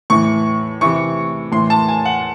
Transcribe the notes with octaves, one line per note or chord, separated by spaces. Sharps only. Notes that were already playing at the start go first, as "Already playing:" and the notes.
A2 E3 C#6
C3 E3 C#6
A2 E3 C6
A5
G#5
F#5